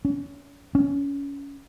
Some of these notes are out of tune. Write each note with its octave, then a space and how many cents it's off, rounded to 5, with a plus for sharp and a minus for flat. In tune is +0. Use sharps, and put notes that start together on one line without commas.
C#4 +35
C#4 +25